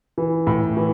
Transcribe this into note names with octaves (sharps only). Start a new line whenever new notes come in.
E3
A2
E3